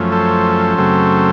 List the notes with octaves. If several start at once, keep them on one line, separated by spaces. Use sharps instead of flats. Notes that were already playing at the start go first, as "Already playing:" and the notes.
Already playing: F#2 F3 A3 C#4
A4 C5
F#2 C#3 F#3 A3 C4